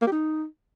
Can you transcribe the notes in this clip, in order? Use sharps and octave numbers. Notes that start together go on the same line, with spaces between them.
A#3
G4
D#4